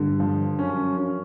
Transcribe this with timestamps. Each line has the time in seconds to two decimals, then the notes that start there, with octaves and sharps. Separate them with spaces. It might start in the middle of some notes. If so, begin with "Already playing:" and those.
Already playing: G2 D3
0.20 F3
0.59 F#2 C#4
0.97 C#4